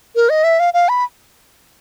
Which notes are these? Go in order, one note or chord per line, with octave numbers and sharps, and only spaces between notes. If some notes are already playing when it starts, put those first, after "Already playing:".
A#4
D#5
E5
F5
F5
B5